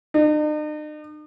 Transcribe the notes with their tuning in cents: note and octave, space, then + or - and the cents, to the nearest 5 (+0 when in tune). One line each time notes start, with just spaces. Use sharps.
D#4 -45